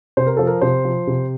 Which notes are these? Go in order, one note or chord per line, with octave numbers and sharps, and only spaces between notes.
C3 C5
A#4
F3 A4
A#4
C3 C5
F3
C3